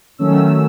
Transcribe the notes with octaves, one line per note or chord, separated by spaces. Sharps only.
D#3 F#3 A3 C#4 E6